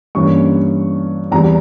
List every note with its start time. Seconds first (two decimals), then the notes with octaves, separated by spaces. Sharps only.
0.15 G2 E3 A#3 C#4 C#6
1.32 E2 E3 G3 A#5